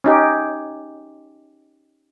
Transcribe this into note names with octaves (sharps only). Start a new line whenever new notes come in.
C#4 D#4 G4